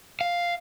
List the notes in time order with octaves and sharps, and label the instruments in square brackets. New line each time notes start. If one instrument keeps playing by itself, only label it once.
[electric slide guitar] F5